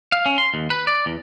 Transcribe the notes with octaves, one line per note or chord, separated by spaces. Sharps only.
F5
C#4
C6
D#2
B4
D5
E2